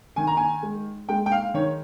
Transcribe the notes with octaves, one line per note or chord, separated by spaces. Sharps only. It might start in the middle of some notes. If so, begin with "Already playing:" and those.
D#3 G#5
A#5
G#5
G#3
G#3 G5
G5
F5
D#3 C#5